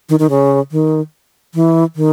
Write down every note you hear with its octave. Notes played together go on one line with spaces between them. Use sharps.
D#3
D#3
C#3
D#3
E3
D#3